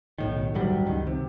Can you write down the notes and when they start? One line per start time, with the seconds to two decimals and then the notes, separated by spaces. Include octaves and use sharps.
0.18 B1 A2 D#3
0.54 D2 G2 F#3 G3
0.86 C#2 D#3
1.07 C3